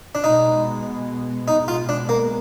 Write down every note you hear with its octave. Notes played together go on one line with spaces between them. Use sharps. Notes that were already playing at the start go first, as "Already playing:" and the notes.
D4
B2 G#3 B3 D#4
B2 G#3 B3 D#4
F4
D4
A#3